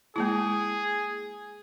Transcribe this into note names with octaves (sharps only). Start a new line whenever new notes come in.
G#3 A#3 E4 G#4